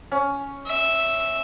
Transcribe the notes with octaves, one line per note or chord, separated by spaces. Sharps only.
C#4
E5